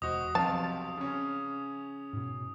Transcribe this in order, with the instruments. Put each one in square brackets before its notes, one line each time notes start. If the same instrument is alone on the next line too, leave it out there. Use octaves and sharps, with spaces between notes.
[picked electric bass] E1 [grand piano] F#4 C5 D#5 [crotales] D#6
[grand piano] B1 C3 F5 [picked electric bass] F3 [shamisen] A5
[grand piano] C#3 C#4
[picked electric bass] G#2 B2